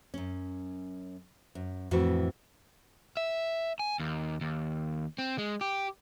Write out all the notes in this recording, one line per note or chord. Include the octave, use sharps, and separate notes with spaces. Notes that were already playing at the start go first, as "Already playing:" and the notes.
F#2 C#4
F#2
F2 A2 E3 F#4
E5
G#5
D#2
D#2
C4
G#3
G4